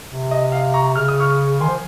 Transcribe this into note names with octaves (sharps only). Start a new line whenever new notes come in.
C3
D#5
F5
A#5 C#6
C#3 F6
D#6
C#6 F6
D#3 G#5 C6
F3